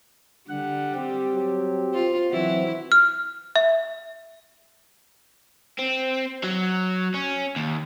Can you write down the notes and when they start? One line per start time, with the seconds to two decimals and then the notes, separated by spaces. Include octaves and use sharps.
0.49 D3 G3 F#5
0.95 C4 G4
1.34 F#3
1.94 F4 C5
2.31 E3 F#3 C4 E4 F#4
2.92 F6
3.56 E5
5.79 C4
6.44 F#3
7.14 C#4
7.56 D#2